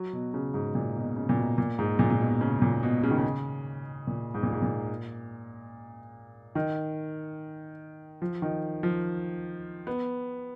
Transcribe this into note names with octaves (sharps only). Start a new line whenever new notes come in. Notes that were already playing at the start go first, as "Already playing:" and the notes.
Already playing: F#3
B2
C#3
G#2
A#2
B2
C#3
A#2
B2
A#2
G#2
A#2
A#2
B2
C#3
A#2
B2
C#3
D#3
C#3
A#2
G#2
A#2
G#2
A#2
D#3
F3
D#3
F3
B3